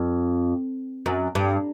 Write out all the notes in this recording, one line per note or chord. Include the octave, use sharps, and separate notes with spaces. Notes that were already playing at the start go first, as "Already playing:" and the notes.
Already playing: F2
F#2
G2